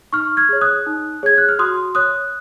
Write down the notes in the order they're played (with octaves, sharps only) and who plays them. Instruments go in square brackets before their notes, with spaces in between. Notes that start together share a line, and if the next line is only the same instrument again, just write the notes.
[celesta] D#4 C#6 F6
F6 G#6
G#4 C#5
D#6 F#6
D#4
G#4 C#5 G#6
F#6
F6
F#4 C6 D#6
C#5 D#6 F#6